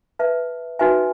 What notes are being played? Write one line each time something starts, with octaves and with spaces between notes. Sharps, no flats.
B4 E5 A5
D#4 F#4 B4 E5 G#5